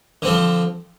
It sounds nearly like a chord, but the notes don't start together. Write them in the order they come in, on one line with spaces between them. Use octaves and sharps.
D3 C4 F3